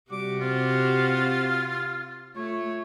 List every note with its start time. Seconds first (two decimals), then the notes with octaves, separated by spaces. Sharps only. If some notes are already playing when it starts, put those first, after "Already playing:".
0.11 C3 G3 F#4 G4 D6
0.41 C4 F4
2.36 A3 F4 C#5